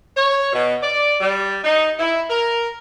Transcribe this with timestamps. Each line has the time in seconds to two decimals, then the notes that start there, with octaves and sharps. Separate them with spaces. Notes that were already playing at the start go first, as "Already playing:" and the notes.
0.16 C#5
0.53 B2
0.82 D5
1.21 G3
1.64 D#4
1.99 E4
2.30 A#4